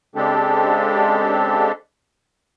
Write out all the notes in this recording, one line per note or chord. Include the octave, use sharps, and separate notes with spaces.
C#3 G#3 C4 D4 G4 A4